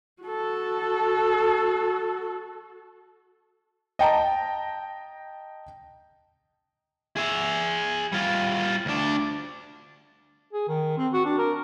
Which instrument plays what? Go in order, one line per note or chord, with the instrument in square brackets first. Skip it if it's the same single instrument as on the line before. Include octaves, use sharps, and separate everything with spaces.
[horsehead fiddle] F#4 A4
[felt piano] D#5 G5 A5 A#5
[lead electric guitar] G#4 E5
G3 F4
D2 D4
[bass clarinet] G#4
D#3
C4
F#4
D4
A#4